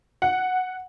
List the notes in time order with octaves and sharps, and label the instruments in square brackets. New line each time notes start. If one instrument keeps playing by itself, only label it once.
[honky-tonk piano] F#5